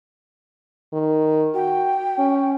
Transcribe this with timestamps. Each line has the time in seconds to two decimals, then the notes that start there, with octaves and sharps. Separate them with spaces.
0.93 D#3
1.55 F#4 G5
2.18 C#4